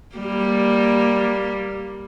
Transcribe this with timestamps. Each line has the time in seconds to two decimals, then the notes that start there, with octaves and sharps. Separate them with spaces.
0.16 G3 A#3